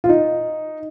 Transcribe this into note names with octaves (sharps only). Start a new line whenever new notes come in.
F4
D#4